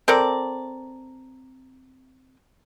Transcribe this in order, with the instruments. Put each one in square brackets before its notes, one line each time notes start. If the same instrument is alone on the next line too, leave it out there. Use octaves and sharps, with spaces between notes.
[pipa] C4 A4 A#4 D5